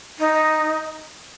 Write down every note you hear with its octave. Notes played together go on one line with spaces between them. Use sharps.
D#4